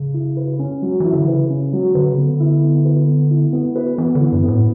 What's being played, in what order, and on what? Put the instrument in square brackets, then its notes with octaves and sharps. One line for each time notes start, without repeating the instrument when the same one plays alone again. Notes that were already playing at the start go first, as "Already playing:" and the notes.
Already playing: [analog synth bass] C#3
[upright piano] E4
B4
C#4
F#3
[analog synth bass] E3 [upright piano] E4
[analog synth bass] D3
[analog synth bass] C#3 [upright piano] B4
[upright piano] C#4
F#3
[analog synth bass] D3 [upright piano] B4
[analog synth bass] C#3
[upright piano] B3
[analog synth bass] D3
[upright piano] E4
B3
B4
B3
E4
B3
B4
[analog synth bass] E3 [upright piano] B3
[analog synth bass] D3
[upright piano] E4
[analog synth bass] G2
[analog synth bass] A2 [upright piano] B3